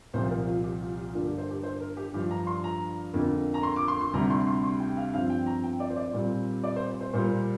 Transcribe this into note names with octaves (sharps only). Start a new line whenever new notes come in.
C2 A#2 F3 C5
A#4
F4
G4
F4
G4
G2 D3 A#3 D4 F4
G4
C5
G4
C5
A#4
G4
G2 F3 D4 G4
A#5
C6
A#5
F2 D3 A#3
A#5
C6
D6
C6
C6
D2 C3 G3 D4 A#5
C6
C6
C6
G5
F5
G2 F3 C4 F5
G5
A#5
G5
D5
C5
D5
A#2 G3 C4
D5
C5
C5
A#2 G3 A#3 C5